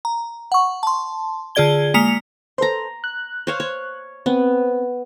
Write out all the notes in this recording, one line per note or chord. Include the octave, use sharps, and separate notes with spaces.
A#5
F#5 C#6
A5 C6
D3 F4 G#4 D5 G#6 G7
G#3 A#3 A#5 B6 C#7 F7
A4 B4 C5 A#5 C6
F#6
C5 C#5 F5
C#5
B3 C4